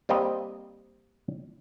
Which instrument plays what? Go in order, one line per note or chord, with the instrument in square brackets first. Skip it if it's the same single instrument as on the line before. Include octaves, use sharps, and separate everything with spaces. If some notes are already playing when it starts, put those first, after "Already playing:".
[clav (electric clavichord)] G3 A#3 C4 G4 D#5